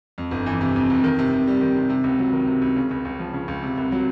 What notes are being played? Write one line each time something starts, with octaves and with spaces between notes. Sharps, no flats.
F2
G1
E3
C3
F2
G1
D#3
C3
C3
G3
D#3
C3
C3
C#2
F#3
D#3
C3
C#2
C#3
C#2
C#2
F3
C#3
C#2
C3
C2
F#3